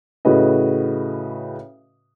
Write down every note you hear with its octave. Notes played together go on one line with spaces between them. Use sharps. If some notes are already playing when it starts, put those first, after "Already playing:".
A2 C#3 F#4 B4 D#5